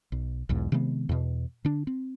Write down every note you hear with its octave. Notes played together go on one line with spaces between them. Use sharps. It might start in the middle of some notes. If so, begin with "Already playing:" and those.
B1
B1 E2 G#2
C3 D#3 G#3 B3
E2 B2
D3 D4
C4